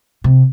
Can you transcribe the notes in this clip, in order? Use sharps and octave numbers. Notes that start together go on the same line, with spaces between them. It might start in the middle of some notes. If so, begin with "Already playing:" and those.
C3